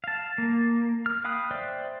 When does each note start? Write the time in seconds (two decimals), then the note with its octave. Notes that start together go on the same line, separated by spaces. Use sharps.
0.04 F5 A5
0.38 A#3
1.06 F6
1.24 F5 G5 B5 D#6 F#6
1.51 C5 D5 E5 G5